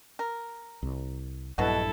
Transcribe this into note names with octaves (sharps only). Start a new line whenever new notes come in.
A#4
C2
A#1 G2 B2 F#3 E4 F#4 A4